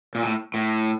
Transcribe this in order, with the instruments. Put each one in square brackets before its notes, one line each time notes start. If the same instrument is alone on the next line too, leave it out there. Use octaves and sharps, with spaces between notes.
[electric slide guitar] A#2
A2
A2